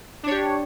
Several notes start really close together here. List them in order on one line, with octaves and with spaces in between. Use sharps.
D4 C#5 G4